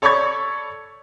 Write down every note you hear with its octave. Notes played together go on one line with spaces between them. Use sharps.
A4 C#5 D5 B5 C#6 G#6